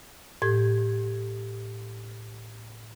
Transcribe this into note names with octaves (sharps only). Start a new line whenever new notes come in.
A2 G4 G#6